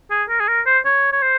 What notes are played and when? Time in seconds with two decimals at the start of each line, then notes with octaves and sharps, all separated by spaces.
0.10 G#4
0.29 A#4
0.40 G#4
0.48 A#4
0.66 C5
0.85 C#5
1.12 C#5
1.22 C5